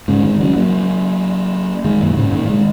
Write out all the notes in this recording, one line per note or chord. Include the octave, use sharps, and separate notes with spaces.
G#2 C#3
D#3 G#3
C#3 F#3
F#3 A#3
D#3 G#3
F#2 A#2
G#2 C#3
A#2 D#3
D#3 G#3